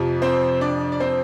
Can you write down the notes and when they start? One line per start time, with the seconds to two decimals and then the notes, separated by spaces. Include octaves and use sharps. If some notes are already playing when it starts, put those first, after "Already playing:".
Already playing: F2 C3 F3
0.22 C4 C5
0.61 D4 D5
0.92 D5
1.00 C4 C5